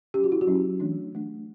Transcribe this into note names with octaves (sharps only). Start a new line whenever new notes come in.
F#3 C#4 G4
F#4
E4
F#4
F#3 C#4
E3 A3 D4
E3 A3 D4